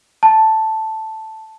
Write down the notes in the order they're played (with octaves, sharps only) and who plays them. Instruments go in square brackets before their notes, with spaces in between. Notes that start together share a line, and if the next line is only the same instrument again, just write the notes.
[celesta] A5